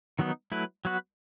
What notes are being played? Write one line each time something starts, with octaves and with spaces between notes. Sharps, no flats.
D#3 F#3 B3 D#4
F#3 A3 E4 B4
F#3 B3 F#4 B4